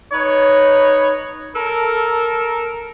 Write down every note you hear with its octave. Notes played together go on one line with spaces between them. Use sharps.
D#4 B4 C#5
A4 A#4